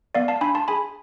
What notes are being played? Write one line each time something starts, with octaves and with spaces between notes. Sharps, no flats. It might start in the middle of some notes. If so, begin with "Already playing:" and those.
B3 D5 F5
F5 A5
D4 G#5 B5
A5 C6
G#4 G#5 B5